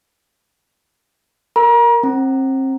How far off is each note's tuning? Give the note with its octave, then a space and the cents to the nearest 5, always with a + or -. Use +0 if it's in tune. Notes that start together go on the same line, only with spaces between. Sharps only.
A#4 +0 A#5 +35
C4 +30 A#5 +0